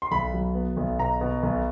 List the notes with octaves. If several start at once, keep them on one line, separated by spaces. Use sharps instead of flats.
C6
B1 B5
F#3
B3
B1
B2 A#5
B2
B1